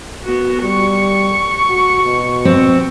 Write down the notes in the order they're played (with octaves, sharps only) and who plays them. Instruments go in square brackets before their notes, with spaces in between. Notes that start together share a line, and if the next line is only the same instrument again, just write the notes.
[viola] B3 F#4
[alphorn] G3 [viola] C#6
[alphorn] F#4
B2
[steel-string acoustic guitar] C4